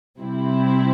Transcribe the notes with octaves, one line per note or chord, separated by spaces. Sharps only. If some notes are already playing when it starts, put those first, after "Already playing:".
C3 G3 C4 E4